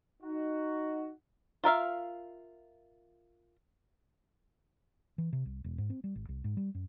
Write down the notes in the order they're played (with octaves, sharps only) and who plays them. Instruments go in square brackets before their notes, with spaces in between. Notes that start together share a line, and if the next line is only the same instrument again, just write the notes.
[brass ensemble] D#4 F#4
[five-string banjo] F4 A#4 E5 F5
[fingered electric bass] E3
C3
C2
E1
G#2
C4
G3
G#1
C2
G#2
G3
F#2